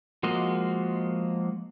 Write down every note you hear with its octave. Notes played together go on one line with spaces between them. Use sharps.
F3 G#3 A#3 F#4 D#5